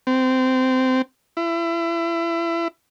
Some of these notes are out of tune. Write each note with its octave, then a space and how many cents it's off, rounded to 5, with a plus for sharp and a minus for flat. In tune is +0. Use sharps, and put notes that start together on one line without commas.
C4 -20
E4 +30